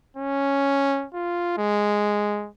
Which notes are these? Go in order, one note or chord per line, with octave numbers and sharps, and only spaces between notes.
C#4
F4
G#3